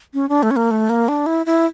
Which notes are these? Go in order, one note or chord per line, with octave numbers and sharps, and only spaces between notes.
C#4
D4
A3
C#4
A#3
A3
A#3
D4
E4
E4